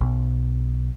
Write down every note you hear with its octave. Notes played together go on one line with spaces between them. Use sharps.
B1